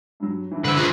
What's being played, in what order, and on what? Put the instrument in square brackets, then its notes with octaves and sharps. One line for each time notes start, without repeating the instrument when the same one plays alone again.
[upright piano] G2 F#3
G2 E3
[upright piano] G2 C5 D7 [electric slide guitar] D3 [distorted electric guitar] B4 E5
[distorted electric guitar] D#3 B4 [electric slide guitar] F4 G#4